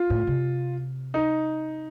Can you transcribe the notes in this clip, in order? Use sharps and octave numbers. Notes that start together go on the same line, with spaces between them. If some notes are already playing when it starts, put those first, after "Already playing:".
Already playing: F4
A2
C3
D#4